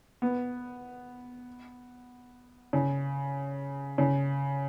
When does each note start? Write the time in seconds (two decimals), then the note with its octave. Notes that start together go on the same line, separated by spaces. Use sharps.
0.22 B3
2.73 C#3
3.98 C#3